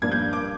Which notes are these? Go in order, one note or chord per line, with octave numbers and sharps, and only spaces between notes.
G2 F3 A#3 D4 G#6
G6
D6